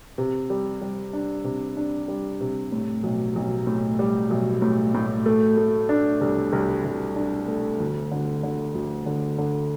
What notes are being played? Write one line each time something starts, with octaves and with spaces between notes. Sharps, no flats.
C3
G3
G3
D4
C3
D4
G3
C3
A2
B1
B1
A2
G3
B1
A2
A2
A3
A3
D4
C2
C2
C2
D4
A3
D2
D3
D3
D2
D3
D3